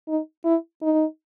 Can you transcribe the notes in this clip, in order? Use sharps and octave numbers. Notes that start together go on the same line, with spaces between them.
D#4
E4
D#4